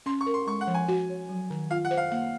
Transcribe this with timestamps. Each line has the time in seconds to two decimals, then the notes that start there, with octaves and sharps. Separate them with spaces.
0.06 C#4 C6
0.21 C#6
0.26 A#4
0.34 C6
0.47 G#3 C#6
0.61 F#5
0.67 F3
0.74 G#5
0.88 F#4
1.09 C#5
1.29 F#3
1.50 D#3
1.71 F4 F5
1.85 F#5
1.91 C5
1.97 F5
2.11 A#3 F#5